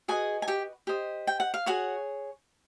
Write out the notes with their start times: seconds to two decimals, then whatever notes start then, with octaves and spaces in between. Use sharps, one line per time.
0.08 F#4 G#4 B4 D#5 G#5
0.42 G#5
0.48 G4 G5
0.87 G4 C5 D#5
1.27 G5
1.40 F#5
1.54 F5
1.66 F#4 G#4 C#5 F#5